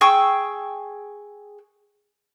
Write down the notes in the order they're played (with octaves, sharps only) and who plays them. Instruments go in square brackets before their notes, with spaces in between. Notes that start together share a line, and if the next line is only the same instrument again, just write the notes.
[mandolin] G#4 G5 C#6 E6